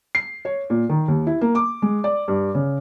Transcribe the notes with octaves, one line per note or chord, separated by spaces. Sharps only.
C7
C#5
A#2
D#3
D#2
E4
A#3
D6
G#3
D5
G2
C#3